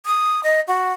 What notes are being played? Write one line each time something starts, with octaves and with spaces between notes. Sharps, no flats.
D#6
D#5
F#4